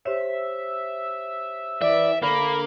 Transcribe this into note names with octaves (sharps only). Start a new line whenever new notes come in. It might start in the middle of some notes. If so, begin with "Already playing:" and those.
G4 C5 C#5 E5
E3 D5 E5
D3 A#3 B5